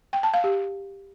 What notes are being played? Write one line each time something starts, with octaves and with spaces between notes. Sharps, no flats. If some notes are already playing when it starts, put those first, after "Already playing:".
G5
A5
F5
G4